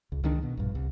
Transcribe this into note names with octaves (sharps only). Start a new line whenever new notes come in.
C#2
C#2 D#3 D4
B2
A#1 G2
C2